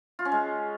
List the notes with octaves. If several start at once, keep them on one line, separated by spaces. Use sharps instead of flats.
F4
C#4
G#3